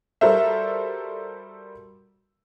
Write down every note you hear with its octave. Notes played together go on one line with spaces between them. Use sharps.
G3 F#4 A4 A#4 C5 E5